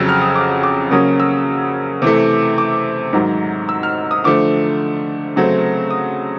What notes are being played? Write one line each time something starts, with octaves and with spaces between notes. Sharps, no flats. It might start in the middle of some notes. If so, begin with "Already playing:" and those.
Already playing: F2 C#3 F#3 E6
F6
D#6
D6
D6
C#3 F#3 A#3 C#4 D#6
E6
C3 E3 A3
D6
G#2 D#3 F#3
E6
F6
D#6
D3 F3 A3 D6
C#3 F#3 A3 C4
D#6